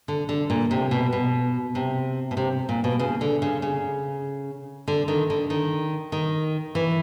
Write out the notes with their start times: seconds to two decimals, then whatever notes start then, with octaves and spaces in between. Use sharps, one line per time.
0.08 D3
0.29 D3
0.50 A#2
0.71 C3
0.91 B2
1.13 B2
1.75 C3
2.31 B2
2.37 C3
2.69 A#2
2.84 B2
3.00 C#3
3.21 D3
3.42 C#3
3.62 C#3
4.88 D3
5.08 D#3
5.30 D3
5.50 D#3
6.12 D#3
6.75 E3